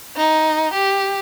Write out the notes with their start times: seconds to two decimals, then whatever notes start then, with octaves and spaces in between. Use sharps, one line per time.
0.17 D#4
0.74 G4